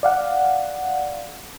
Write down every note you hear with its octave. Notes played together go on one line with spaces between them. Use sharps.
D5 F5 F#5